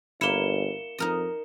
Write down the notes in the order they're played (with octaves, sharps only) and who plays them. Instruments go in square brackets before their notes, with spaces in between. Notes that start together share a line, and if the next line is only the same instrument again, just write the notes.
[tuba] G1 [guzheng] A#3 E4 [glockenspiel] C#7 E7 G7
[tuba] F2 [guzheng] D#4 A#4 D#5